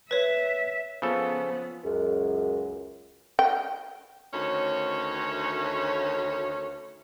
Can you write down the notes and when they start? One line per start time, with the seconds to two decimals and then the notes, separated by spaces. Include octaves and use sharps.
0.11 B4 C#5 E5
1.02 C#3 F3 B3 A4
1.84 C#2 F#2
3.39 G5
4.33 D2 D#3 C#4 F#4 C#5